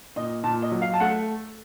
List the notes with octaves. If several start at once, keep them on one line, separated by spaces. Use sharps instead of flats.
A#2 D#5
A#2 A5
D#5
F#3
F5
A5
A3 F#5